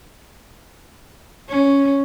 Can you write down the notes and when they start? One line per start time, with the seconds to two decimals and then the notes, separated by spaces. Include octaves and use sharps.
1.49 C#4